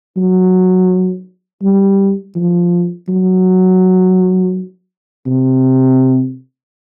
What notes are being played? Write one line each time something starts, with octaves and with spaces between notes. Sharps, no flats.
F#3
G3
F3
F#3
C3